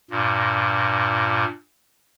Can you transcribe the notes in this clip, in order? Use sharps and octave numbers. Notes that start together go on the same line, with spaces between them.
G2 A#2